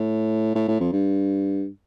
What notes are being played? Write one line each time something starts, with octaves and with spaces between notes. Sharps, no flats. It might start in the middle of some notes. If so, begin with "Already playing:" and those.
Already playing: A2
A2
A2
F2
G2